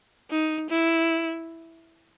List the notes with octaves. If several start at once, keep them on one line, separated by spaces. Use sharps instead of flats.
D#4
E4